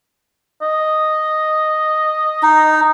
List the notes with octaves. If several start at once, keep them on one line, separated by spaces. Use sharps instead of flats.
D#5
D#4